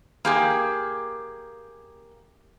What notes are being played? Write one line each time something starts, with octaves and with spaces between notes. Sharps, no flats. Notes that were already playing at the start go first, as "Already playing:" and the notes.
A#3 G4 G#4